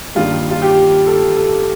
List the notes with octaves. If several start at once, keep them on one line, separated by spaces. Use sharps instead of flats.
G2 D#3 A#3 D4 F4
F4
G4
A4
A4